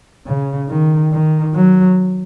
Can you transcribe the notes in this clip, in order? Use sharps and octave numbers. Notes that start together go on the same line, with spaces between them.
C#3
D#3
D#3
F#3